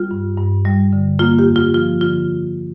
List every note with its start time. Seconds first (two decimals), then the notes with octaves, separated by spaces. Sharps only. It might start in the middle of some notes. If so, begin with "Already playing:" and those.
Already playing: G3 F4
0.11 G2
0.37 G2
0.65 G3
0.93 D3
1.19 A#3 F4
1.39 G4
1.47 F2
1.56 F4
1.74 F3 F4
2.01 D3 F4